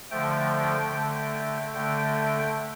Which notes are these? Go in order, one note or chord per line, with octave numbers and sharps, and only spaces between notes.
D3 F3 A3 G5
D3 A3
D3 A3 G5